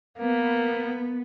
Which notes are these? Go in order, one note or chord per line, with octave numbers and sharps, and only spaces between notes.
A#3 B3